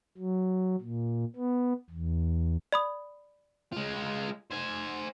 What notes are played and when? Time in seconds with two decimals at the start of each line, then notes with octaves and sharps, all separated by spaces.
0.18 F#3
0.81 A#2
1.36 B3
1.90 E2
2.72 D5 B5 D#6
3.72 G#3 F4
4.51 C5 G#5